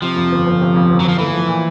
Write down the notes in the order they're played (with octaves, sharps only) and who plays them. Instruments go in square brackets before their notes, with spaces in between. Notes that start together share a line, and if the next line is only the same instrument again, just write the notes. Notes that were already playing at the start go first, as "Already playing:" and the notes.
[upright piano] C3 [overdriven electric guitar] F3
[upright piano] F2
G1
G1
C3
F2
G1
[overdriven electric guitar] F#3
[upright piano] G1 [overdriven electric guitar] F3
[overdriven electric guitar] E3 [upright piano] A3
[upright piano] F3
A#2